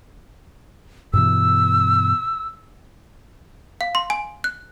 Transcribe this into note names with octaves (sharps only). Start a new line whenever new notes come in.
G2 B2 E3 E6
F5
C6
G#5
F#6